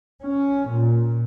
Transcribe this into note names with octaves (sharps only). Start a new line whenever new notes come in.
C#4
A#2